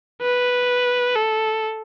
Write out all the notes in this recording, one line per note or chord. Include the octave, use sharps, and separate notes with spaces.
B4
A4